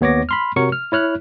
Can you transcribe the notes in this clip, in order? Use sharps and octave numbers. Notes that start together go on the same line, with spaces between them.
D#2 B3 C#5 D6 A#6
B5 C6 F6
C3 F#4 A#4 C#5 C#6 C#7
F6
E4 C#5 F6 F#6